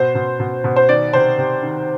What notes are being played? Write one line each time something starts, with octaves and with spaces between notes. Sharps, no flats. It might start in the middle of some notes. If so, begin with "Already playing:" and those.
Already playing: B2 C5
B2
B2
B2
C5
D#3 D5
C3 C5
C3
D#3